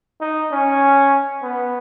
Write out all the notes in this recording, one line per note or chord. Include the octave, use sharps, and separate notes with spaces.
D#4
C#4
B3